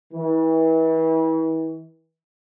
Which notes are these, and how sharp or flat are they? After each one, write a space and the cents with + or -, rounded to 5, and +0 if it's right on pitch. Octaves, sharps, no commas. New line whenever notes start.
E3 -35